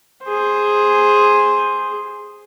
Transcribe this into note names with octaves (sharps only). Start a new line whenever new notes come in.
G#4 C5